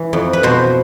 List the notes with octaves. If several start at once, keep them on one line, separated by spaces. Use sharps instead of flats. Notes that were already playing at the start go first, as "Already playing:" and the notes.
Already playing: E3
F2
B4
B2 C5